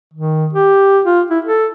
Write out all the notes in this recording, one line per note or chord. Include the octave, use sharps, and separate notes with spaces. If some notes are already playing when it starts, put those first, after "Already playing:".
D#3
G4
F4
E4
A4